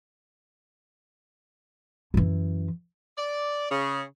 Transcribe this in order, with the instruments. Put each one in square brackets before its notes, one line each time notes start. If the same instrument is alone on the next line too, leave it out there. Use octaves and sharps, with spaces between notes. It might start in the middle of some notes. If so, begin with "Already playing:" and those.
[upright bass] F#2 E3
[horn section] D5
C#3